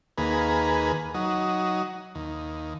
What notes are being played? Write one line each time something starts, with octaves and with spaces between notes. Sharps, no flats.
D#2 A#3 G#4 B4
F#3 D#4
D#2